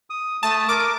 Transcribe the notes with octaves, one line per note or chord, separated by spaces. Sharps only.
D#6
A3 A5 D#6
A#4 D6